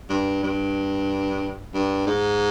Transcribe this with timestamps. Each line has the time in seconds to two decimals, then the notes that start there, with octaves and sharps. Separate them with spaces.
0.10 G2
0.43 G2
1.74 G2
2.07 G#2